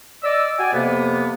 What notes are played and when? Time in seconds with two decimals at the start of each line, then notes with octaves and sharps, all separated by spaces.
0.24 D5 D#5 E6
0.59 F#4 D5 D#5 G5 G#5
0.73 F2 C3 A#3 B3